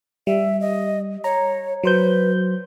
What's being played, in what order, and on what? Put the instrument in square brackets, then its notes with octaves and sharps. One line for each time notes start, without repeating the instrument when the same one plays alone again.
[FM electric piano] G3 [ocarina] E5
[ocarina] D#5
[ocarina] C#5 [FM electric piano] A#5
[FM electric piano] F#3 C5 G6 [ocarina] B4